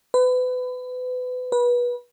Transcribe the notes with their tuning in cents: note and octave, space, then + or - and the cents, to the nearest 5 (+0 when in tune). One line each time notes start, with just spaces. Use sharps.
B4 +30
B4 -25